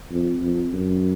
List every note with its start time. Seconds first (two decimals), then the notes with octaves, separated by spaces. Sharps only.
0.11 F2
0.42 F2
0.73 F#2